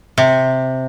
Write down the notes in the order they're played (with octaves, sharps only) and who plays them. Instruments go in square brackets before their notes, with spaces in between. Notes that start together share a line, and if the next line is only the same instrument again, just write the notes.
[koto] C3